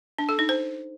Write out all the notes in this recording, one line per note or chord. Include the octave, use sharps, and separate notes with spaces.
D4
A4
D#4
C5